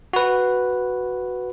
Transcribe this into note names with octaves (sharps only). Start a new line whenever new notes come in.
F#4 B4